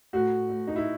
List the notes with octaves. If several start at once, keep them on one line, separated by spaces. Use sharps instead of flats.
A2 F#4
A2
D#4
E4